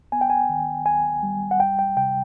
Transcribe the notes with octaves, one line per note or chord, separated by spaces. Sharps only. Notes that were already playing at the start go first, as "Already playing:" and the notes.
Already playing: D2
B3 G#5
G5
G#5
D#3
D#2 G#5
G3
F#5
D2 G5
G5
C3 G5